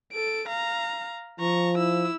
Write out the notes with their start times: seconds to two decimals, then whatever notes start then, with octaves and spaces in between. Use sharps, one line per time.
0.13 A4 D7
0.48 F5 A#5
1.40 F3 A#5 C#6
1.78 E4 E6